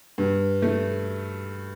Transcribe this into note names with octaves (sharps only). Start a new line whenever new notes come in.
G2
A3